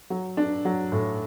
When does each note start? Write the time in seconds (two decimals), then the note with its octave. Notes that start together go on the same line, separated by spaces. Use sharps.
0.10 F#3
0.37 D4
0.65 F#3
0.92 A2